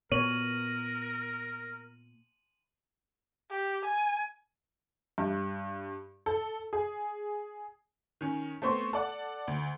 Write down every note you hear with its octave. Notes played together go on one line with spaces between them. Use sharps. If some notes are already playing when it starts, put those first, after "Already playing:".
A#2 B3 A#4 C#5 D#7 F#7
G4
G#5
G2
A4
G#4
D#3 C#4
A3 B3 C4 C6 C#6
A4 D5 F#5
D2